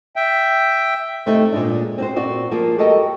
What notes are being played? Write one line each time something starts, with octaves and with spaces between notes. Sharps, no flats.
E5 G5
C3 A3 C4 D#4
A#2 G#3 D4
C4 F#4 C5
A#2 C4 F#4 D5
F3 A#3 F4 G#4
F#4 G4 A4 A#4 D#5 G5